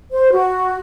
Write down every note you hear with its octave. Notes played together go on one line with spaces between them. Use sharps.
C5
F#4